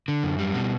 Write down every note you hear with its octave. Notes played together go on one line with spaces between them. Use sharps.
D3
F#2
G3
B2